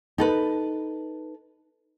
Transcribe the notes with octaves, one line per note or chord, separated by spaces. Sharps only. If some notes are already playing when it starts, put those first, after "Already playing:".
D#4 A4 B4